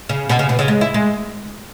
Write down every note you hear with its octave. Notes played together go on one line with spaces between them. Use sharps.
C#3
B2
C#3
B2
C#3
G#3
E4
G#3